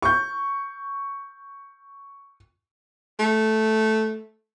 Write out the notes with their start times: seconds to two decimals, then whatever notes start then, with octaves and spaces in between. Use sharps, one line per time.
0.02 C#6 G6
3.20 A3